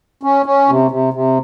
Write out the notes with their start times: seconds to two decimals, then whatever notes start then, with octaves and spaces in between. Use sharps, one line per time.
0.23 C#4
0.46 C#4
0.69 C3
0.91 C3
1.13 C3